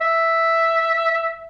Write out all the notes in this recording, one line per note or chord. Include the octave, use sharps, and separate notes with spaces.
E5